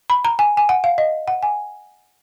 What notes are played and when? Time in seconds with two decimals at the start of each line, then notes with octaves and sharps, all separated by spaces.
0.10 B5
0.25 A#5
0.39 G#5
0.57 G#5
0.69 F#5
0.84 F5
0.98 D#5
1.28 F#5
1.43 G#5